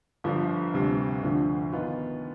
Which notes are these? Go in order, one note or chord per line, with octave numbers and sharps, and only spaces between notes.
G1 G2 D3 F3
D2 C3 G3
D2 D3 F3
D#3 B3 F4